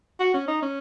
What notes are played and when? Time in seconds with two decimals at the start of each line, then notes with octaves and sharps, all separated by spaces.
0.20 F#4
0.34 C#4
0.48 D#4
0.62 C#4